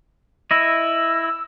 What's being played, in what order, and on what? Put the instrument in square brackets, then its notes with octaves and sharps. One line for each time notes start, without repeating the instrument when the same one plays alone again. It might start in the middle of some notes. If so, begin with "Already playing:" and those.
[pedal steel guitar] E4 D#5 [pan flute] E6